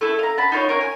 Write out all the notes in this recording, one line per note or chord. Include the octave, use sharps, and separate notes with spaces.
A3 E4 A4
F5 A#5
F#5 A5 B5
D#4 F4 C5 C#5
A#4 C#5 F#5 G#5
G#5